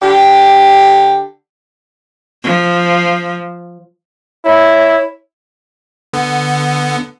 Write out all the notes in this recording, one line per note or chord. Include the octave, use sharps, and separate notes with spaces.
D3 G4
F3
E4 C#5
D3 B3